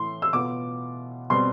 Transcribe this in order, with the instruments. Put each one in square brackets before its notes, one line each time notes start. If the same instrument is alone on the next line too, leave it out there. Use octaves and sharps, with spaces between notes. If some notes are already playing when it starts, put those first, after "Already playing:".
Already playing: [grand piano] A2 E3 A3 [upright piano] C6
[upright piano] E6
[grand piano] B2 B3 F4 [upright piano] D6
[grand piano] B2 G3 C4 [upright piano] C6